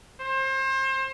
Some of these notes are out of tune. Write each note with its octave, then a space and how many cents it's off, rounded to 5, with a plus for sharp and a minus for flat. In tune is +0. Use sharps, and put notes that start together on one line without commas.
C5 +30